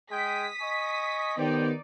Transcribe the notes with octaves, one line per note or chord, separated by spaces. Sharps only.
G#3 G#4 G5 D#6 B6
D#5 G#5 C#6
D#3 B3 D#4 G4 C5 D5 G5